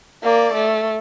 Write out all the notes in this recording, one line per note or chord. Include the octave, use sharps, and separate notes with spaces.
A#3 D5
A3